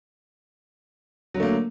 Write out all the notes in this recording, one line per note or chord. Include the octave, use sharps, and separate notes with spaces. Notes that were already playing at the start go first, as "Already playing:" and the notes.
D3 F#3 A3 A#3